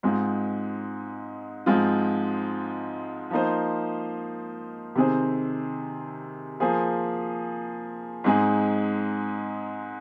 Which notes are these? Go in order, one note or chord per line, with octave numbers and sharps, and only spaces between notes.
G#2 G#3 C4 F4
G#2 F3 G#3 C4 F4
F3 A#3 D#4 C5
C3 D#3 C4 G#4 C5
F3 A#3 G#4 C5
G#2 G#3 C4 D#4 G#4